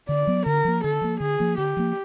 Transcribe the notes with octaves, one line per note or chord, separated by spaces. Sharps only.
D3 D5
F#3 B3
D3 A#4
F3 A#3
D3 A4
F3 A#3
D3 G#4
F3 A#3
D3 G4
F3 A#3